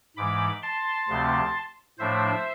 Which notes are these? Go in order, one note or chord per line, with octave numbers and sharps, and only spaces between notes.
G#2 E3 G#3 B5 D6
A5 C6
D2 C3 F3 A3 C4
A2 F3 A3 D4 C5 E5